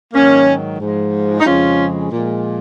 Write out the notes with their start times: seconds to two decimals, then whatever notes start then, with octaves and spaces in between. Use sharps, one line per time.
0.13 G#2 D#3 F#3 A#3 C#4
0.79 G#2 F3 G#3
1.40 D#4
1.44 F2 C#3 F3 G#3 C#4 F4
2.10 A#2 F3 G#3